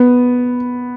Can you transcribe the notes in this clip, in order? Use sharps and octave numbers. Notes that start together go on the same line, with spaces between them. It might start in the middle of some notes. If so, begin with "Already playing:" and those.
Already playing: B3